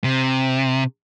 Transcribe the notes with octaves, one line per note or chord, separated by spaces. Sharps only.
C3